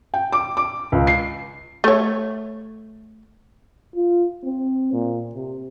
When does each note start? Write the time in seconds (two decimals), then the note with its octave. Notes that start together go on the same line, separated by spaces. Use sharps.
0.14 G5
0.32 D6
0.57 D6
0.92 C#2
1.07 C7
1.84 A3 C#5
3.95 F4
4.44 C4
4.93 A#2
5.35 C3